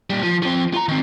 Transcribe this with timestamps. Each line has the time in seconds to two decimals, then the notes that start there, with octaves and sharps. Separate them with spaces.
0.10 A#2 G3
0.23 F3
0.43 F3 C4
0.74 F4 A#5
0.89 D#3 C4